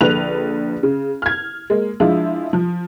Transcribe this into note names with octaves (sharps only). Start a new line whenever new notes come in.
A#1 D3 B4 F#6 F7
C#3
F6 G#6
G#3 A#3
F3 G#3 D4 E4 F4
F3